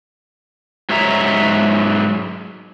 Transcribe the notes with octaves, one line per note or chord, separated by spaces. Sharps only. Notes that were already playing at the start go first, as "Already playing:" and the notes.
G#2 F#3 C#5 E5 A#5